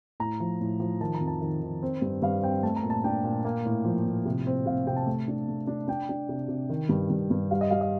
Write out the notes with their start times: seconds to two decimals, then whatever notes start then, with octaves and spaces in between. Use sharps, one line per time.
0.20 A2 A#5
0.40 F3
0.61 A2
0.80 F3
1.01 D#3 A5
1.15 A#5
1.21 F2
1.28 A5
1.41 D#3
1.62 D#3
1.83 C4
2.02 G2
2.22 G2 F5
2.43 C4 G5
2.63 A3 A5
2.76 A#5
2.83 A#2
2.90 A5
3.04 D4 G5
3.24 A#2
3.45 A#3
3.65 A2
3.85 F3
4.06 A2
4.26 C3
4.47 C4
4.66 C3 F5
4.87 C3 G5
4.96 A5
5.07 A3
5.28 D4
5.48 A3
5.67 D4
5.88 D4 G5
6.09 D4
6.29 C3
6.49 C3
6.70 D#3
6.89 G2
7.10 G2
7.31 G2
7.51 G3 F5
7.61 D#5
7.70 G3 F5
7.81 D#5